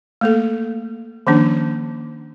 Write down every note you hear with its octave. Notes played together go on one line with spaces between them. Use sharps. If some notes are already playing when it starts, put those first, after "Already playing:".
A3 A#3 A4
D#3 F3 A#3 C#4 D4